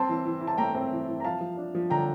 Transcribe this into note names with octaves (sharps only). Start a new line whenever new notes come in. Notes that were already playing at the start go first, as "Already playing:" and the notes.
Already playing: C4 A5 C6
E3
E3
E4
A5
A3 G5 A#5
C4
E3
E3
A#5
F3 F5 A5
F3
D4
F3
D3 G5 A#5